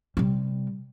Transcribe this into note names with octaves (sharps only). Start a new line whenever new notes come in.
C3 G3